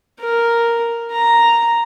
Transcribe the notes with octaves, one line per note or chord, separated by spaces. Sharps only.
A#4
A#5